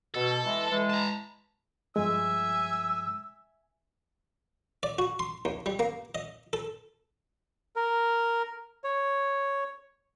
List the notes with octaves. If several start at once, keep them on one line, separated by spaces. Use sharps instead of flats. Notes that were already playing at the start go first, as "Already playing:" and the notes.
B2 A4
E3 G#3
E3 G#3
A5 A#5
G2 F3 G#3 E5 G#5 E6
D5
F#4
C6
D#2
G3
A#3
D#5
A4
A#4
C#5